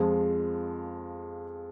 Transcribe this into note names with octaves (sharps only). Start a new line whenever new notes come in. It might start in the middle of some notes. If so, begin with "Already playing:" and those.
Already playing: F2 F3 G#3